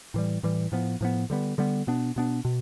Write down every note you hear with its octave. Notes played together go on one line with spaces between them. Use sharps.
A2 E3 G3
A2 E3 G3
A2 F3 B3
A2 F3 B3
D3 G3 B3
D3 G3 B3
B2 B3 D4
B2 B3 D4
B2